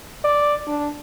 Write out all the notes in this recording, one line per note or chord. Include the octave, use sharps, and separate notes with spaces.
D5
D4